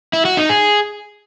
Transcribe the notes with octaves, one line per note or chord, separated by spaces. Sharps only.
E4
F#4
D#4
G#4